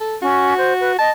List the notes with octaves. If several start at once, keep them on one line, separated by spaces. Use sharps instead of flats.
A4
C#4 F#4
C5
B4
D#5 A5